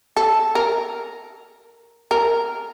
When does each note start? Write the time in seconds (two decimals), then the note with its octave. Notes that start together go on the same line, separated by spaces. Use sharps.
0.17 A4
0.55 A#4
2.11 A#4